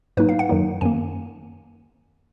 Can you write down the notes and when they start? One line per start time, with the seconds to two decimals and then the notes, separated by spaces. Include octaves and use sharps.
0.17 G#2 F#3 A#3 D#4 B4
0.29 F5
0.39 F#5
0.49 F#2 D#3 F#3 A#3 D#4
0.81 F#2 D#3 A#3 G#5